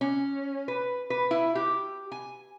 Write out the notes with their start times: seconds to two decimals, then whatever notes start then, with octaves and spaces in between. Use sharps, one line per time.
0.01 C#4
0.68 B4
1.10 B4
1.31 E4
1.55 G4
2.12 G#5